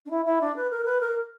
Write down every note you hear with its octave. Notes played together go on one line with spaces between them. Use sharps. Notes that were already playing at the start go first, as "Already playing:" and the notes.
D4
E4
E4
D4
B4
A#4
B4
A#4